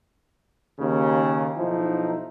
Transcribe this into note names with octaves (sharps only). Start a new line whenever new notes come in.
D#2 C#3
B1 F3 D#4 E4